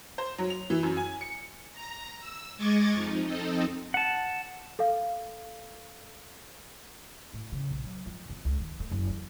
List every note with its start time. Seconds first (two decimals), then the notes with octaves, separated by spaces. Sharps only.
0.18 C5
0.38 F#3
0.50 F7
0.70 E3
0.83 F#2
0.97 G#5
1.21 C#7
1.73 A#5
2.20 E6
2.58 G#3 D#5 C#6 D6 G#6 A6
2.94 F2 F3 D#4
3.26 F2 C4 D#4 A4 D#5
3.94 F#5 A5
4.79 A4 F5
7.33 A2
7.52 C#3
7.70 A#1
7.84 F#3
8.06 F2
8.29 F2
8.45 C#2
8.60 D#3
8.80 A3
8.91 F#1
9.09 E2